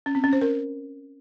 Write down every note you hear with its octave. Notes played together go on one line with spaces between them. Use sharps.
C#4
C4
C#4
C5
A#4